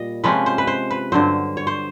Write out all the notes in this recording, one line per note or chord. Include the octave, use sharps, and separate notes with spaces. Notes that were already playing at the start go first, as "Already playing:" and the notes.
Already playing: A#2 G3 D#5
C3 F3 G#3 C#4 B4
C5
B4
C5
B4
G2 D3 F#3 C5
C#5
C5